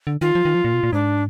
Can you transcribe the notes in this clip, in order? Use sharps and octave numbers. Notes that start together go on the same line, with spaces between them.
D3
D#3 F4
F3
D#3
F3
A#2
B2
A#2
G#2 D4